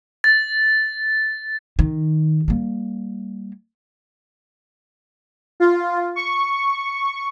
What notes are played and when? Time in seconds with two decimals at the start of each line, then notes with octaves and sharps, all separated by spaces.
0.24 A6
1.79 D#3
2.48 G3 A#3
5.60 F4
6.16 C#6